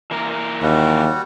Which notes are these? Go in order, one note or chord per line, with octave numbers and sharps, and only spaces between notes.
E3 A#3 A#4
D#2 G3 F#4